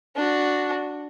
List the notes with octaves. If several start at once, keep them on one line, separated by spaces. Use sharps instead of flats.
D4 F#4